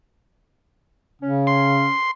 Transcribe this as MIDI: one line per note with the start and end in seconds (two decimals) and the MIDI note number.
1.21 1.86 49
1.21 1.93 61
1.47 2.11 84